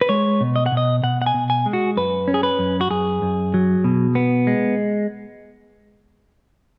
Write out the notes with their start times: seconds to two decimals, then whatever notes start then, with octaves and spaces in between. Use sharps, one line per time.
0.01 B4
0.09 G#3 C#5
0.41 B2
0.56 D#5
0.66 F#5
0.72 B2
0.77 D#5
1.03 B2 F#5
1.22 F#5
1.26 G#5
1.34 B2
1.50 G#5
1.66 G#3
1.73 F#4
1.97 F#2 B4
2.28 C#4
2.34 G#4
2.43 B4
2.59 F#2
2.81 F#4
2.90 F#2 G#4
3.22 F#2
3.54 F#3
3.84 B2
4.15 B3
4.47 G#3